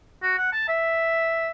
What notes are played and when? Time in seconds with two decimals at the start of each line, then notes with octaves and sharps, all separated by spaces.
0.22 F#4
0.37 F#5
0.52 A5
0.68 E5